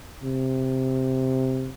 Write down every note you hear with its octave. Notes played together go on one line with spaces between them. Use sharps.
C3